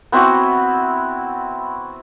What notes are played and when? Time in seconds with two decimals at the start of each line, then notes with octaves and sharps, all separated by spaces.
0.12 B3 C4 E4 F#4